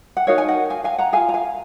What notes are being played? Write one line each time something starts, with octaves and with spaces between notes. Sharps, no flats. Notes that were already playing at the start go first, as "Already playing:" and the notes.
F#5
D#4 F#4 A#4 C#5 F5
G#5
D#5 F#5
F5 G#5
F5 G#5
F#5 A#5
F4 G#4 F5 G#5
A#5
F5 G#5